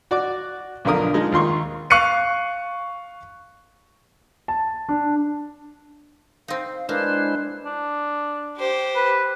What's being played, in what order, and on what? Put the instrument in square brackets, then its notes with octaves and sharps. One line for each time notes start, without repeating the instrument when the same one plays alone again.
[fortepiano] F#4 D5 D6
B1 F2 D3 A#4 D#6
F3 G#3 D#4
D#2 F4 C6 C#6
[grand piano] F5 C#6 F#6 C7 C#7 D#7
A5
D4
[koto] C4 D#4 [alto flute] F5
[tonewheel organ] G#3 E4 C5 [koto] A#3 [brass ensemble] D4 [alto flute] B4
[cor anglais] D4
[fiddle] G4 C5
[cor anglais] B4